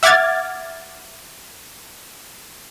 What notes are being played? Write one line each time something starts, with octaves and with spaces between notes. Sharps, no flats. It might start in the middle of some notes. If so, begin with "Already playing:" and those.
E5 F#5 D6 F6 G#6 A6